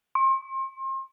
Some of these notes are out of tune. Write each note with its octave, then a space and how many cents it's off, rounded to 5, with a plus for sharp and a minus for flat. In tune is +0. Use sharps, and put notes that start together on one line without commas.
C6 +35